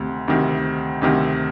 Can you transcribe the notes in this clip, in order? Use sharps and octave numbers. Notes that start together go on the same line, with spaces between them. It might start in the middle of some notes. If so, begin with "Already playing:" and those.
Already playing: D2 C3 D#3
D2 C3 D#3
D2 C3 D#3